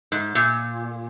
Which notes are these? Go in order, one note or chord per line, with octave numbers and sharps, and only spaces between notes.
G#2
A#2